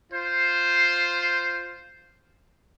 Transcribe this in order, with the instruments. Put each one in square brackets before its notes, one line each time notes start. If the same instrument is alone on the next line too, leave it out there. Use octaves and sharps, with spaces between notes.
[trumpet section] F4 C5